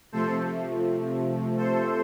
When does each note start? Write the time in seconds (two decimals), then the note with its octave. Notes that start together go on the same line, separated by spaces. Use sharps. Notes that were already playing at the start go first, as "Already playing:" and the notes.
0.12 C3 F3 A3 A4 C5
1.57 A4 C5